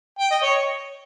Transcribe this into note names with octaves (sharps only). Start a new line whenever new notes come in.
G5
D#5
C#5